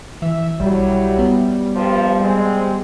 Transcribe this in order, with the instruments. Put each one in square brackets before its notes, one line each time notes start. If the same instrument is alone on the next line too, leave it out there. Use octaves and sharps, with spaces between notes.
[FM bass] E3 [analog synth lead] E5
[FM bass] B1 [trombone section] F#3 E4 [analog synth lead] G3
[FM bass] B3
[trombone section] A#1 G2 F3
G#3 C4